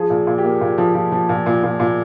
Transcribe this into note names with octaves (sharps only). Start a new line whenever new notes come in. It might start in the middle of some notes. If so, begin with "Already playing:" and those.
Already playing: F3 G#4
A#2
A#2
G4
A#3
A#2
F3
F3
F3
A#2
A#2
A#2
A#2